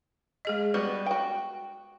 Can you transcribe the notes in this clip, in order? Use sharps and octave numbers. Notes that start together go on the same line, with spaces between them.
G#3 G#4 D#5
G3 B3 F#4 B4
F#4 G5